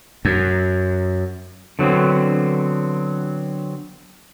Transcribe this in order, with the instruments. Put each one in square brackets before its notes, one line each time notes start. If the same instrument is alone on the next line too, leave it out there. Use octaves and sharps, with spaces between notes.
[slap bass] F#2
[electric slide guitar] D3 F#3 B3 C4